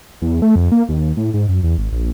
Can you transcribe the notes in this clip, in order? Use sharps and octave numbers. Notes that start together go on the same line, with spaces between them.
E2
A3
F2
A#3
D#2
A2
G#2
F#2
E2
G#1
A#1